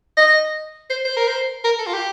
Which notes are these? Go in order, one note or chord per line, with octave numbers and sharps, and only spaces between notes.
D#5
C5
C5
A#4
C5
A#4
A4
F4
G4